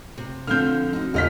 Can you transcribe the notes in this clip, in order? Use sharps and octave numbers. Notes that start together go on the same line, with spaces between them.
C3
D3 F3 C4 F6 G6
D#4 F#4
E1 F4 G4 D#5 F6 B6